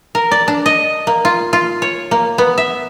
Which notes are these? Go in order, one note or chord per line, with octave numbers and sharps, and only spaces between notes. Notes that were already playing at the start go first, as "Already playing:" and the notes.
A#4
D5
D4
D#5
A#3
F4
F4
C#5
A#3
B3
E5